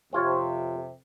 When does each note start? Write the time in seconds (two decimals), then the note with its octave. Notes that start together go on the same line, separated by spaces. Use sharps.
0.13 F2 C3 C4 F4 C#5